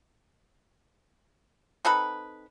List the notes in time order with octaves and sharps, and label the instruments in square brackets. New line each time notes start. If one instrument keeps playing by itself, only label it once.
[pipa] C4 D#4 A4 B4